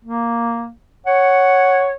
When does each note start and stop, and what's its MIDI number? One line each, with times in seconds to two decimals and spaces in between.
0.04 0.70 58
1.06 1.94 73
1.06 1.88 78